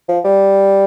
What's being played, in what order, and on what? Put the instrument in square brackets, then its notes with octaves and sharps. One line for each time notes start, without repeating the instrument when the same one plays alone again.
[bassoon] F3
G3